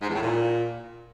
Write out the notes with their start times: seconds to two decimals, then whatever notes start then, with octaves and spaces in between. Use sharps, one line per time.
0.01 G#2
0.08 E2
0.15 A2
0.22 A#2